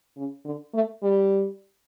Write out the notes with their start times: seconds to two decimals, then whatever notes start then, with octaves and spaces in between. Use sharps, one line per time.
0.17 C#3
0.45 D3
0.74 A3
1.02 G3